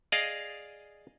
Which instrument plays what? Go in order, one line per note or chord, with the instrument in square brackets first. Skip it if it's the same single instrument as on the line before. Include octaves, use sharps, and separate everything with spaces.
[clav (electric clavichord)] G#4 D5 D#5 F5